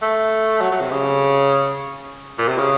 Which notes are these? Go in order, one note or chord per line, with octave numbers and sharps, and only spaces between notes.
A3
F#3
F#3
C3
C#3
A#2
C3
C#3